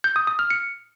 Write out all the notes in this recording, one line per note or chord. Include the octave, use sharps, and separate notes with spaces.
G6
D#6
D#6
F6
C#7